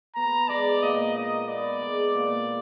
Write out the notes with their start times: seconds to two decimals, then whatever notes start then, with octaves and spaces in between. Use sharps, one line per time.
0.15 B3 A#5
0.49 G#3 D5
0.82 A#2 D#5
1.15 D#4 D#5
1.48 B3 D5
1.82 G#3
2.15 A#2